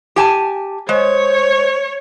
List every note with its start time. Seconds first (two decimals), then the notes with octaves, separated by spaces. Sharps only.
0.16 G4 G#5 A5
0.89 G#3 C5 C#5